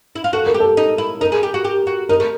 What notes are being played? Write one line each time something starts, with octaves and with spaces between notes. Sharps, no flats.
E4
F4
F#4 A4
A#4
G4
A4
D#4
E4
D#4 A#4
G#4
G4
F#4
G4
F#4
D#4 A#4
A3